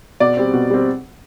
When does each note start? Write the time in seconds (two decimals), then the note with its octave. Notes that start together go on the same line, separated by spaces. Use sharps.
0.20 B2 D5
0.37 G3 C4
0.53 B2
0.70 G3 C4